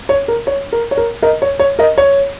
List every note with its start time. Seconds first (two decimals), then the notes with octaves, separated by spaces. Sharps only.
0.09 C#5
0.28 A#4
0.47 C#5
0.72 A#4
0.91 C#5
0.97 A#4
1.22 A#4 D#5
1.42 C#5
1.59 C#5
1.79 A#4 D#5
1.98 C#5